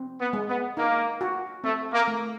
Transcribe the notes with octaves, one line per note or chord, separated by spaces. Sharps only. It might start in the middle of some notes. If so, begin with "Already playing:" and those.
Already playing: C4
B3
G#3
B3
A#3 D#4
F#4
A3 C4
A#3
A3